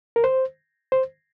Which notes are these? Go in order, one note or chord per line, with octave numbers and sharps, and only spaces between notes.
A#4
C5
C5